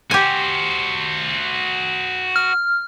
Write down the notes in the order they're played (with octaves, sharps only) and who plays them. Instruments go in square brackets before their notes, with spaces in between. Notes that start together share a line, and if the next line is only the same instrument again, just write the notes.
[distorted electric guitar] F#4 C5 [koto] G4 G#5
[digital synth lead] F6